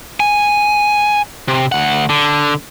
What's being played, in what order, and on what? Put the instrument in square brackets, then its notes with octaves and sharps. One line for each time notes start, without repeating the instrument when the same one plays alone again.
[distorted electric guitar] G#5
C3
D2 F#5
D3